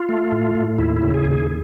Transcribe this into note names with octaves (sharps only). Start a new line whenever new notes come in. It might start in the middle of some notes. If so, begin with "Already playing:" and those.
Already playing: F4
A3
A2
A2
D#2 E4
E4
C#3
G#4
D#2
G#4